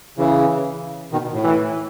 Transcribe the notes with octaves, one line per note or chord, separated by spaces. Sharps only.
C#3 E3
B2 D#3
B2
A2
E3